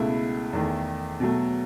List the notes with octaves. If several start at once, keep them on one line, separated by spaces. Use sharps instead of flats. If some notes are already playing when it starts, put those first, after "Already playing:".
Already playing: C#2 B2 A3 E4
E2 D#3 A3
B2 F#3 A3